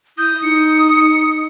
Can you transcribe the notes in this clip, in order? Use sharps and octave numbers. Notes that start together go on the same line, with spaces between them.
E4 D#6 G6
D#4 C#7